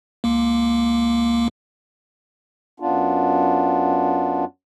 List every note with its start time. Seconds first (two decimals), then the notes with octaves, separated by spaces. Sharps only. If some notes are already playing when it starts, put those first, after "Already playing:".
0.24 C#2 A#3
2.80 F#2 B3 D4 F4